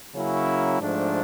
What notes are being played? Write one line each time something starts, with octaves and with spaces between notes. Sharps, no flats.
C#3 F#3 A#3 C#4 E4
G#2 F3 A3 D4